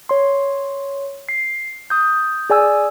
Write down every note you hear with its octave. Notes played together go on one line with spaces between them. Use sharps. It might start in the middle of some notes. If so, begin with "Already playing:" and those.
C#5 C6
C7
D#6 G6
G#4 D5 G#5 E6